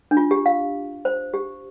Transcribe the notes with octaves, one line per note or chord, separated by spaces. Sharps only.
D4
F4
G4
F5
C5
G4